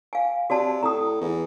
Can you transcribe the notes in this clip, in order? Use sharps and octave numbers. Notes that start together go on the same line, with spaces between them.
F5 G#5
C3 F#4 D5 A5
A2 A#5 D#6
E2